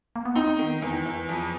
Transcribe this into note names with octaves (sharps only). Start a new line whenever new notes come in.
A#3
B3
C4 D#4
D#3 B3
A#3
E2 B3
E2
F2